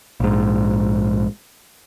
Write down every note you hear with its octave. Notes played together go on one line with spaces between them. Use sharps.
A#1 G#2